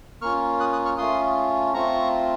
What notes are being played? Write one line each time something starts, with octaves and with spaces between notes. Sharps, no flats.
A#3 C#4 F4 C#6 F6
D#6 F#6
D#6 F#6
C#6 F6
A3 C#4 F4 C6 D#6
A3 C4 F4 A#5 C#6